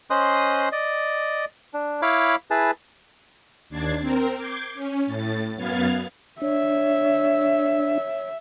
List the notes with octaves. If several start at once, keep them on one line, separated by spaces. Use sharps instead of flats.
C#4 C5 D#5 C6 D#6 F#6
D5 D#5
D4
E4 C#5 F5 B5 D6
E4 G#4 B4 A5
D#2 D4 G#6 A6 C7
C4 A#4
D6 G6 G#6 C7
C#4
A2 A6
F#2 B3 F5 F6 G#6 A6
D4 C#5 E5